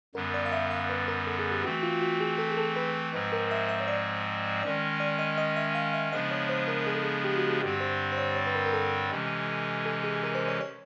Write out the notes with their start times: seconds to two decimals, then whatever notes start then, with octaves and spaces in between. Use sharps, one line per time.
0.15 F#2 D3 G3 B3 A#4
0.34 D5
0.46 F5
0.52 E5
0.71 F5
0.89 B4
1.08 A#4
1.27 A4
1.39 G#4
1.52 G4
1.64 E3 A3 C4 F#4
1.83 F4
2.02 F#4
2.20 G#4
2.38 A4
2.51 G#4
2.57 A4
2.76 B4
3.13 G#2 F3 G#3 C4 B4
3.32 A#4
3.51 E5
3.69 E5
3.80 C#5
3.88 D5
4.63 D#3 G#3 C#4 D5
5.00 D5
5.19 D#5
5.38 D#5
5.57 E5
5.75 F5
5.93 E5
6.12 C#3 F3 G#3 B3 D4 D#5
6.31 C#5
6.49 C5
6.68 A#4
6.87 G#4
6.95 A4
7.03 G#4
7.24 G4
7.37 F#4
7.49 G#4
7.61 G2 D3 G3 C4 G4
7.80 C5
8.12 C5
8.18 C#5
8.36 C#5
8.47 B4
8.55 A#4
8.66 A#4
8.73 A4
9.11 C3 E3 G#3 C#4
9.86 A4
10.04 G#4
10.23 A#4
10.35 C5
10.48 C#5
10.61 C#5